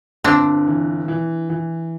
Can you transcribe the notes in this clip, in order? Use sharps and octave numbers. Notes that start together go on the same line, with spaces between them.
G1 C4 D4
E3
E3
E3